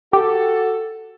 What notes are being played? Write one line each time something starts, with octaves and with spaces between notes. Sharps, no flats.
F#4 G4 A4